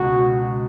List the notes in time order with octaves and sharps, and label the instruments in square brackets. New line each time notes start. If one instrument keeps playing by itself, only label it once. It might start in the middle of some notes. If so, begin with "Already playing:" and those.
Already playing: [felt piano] C#2 B2 G#3 [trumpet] F#4